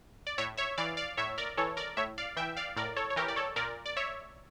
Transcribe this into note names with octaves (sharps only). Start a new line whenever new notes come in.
D5
A2 C#5 E5
C#5 E5
E3 D5 F5
D5 F5
A2 C#5 E5
A#4 D5
E3 A4 C#5
A#4 D5
A2 C#5 E5
D5 F5
E3 E5 G5
D5 F5
A2 A#4 D5
A4 C#5
C#5
E3 G4 A#4
D5
A4 C#5
A#2 A#4 D5
D5
C#5 E5